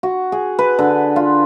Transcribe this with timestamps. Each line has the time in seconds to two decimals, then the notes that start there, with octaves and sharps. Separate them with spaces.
0.03 F#4
0.32 G#4
0.59 B4
0.79 D3
1.16 F4